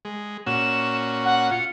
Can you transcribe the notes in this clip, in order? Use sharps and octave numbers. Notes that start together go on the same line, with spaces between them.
G#3
A#2 C#4 F#4 E7
F#5
F4 C#7